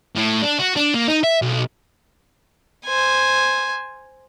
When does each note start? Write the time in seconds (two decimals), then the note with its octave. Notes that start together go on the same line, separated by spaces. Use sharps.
0.15 A2
0.42 D4
0.59 F#4
0.76 D4
0.94 A#3
1.08 D#4
1.23 E5
1.42 B1
2.86 C5 G#5